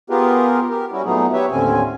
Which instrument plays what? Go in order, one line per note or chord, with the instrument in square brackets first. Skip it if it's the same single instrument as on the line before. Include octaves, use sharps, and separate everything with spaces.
[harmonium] B3 F4 G4 G#4 A#4 B4
G4 A#4
G3 C#4 E4 F#4
A#2 F#3 A3 B3 D#4 G#4
G4 B4 C#5 E5
D#2 A2 D3 C4 C#4 G#5